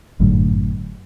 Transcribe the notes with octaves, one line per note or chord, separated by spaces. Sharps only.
G1 F#2 A2 D3